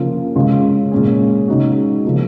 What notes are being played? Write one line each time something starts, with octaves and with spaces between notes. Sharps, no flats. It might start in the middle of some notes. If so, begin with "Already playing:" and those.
Already playing: C#3 F3 A#3 F4
C#3 G#3 C#4 F4
A#2 G#3 C#4 G#4
C#3 G#3 D#4 F#4
C#3 F3 A#3